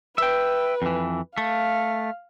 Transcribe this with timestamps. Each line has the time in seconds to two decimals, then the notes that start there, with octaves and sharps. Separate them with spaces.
0.18 B4 E5 G5
0.82 F2 E3
1.38 A3 F5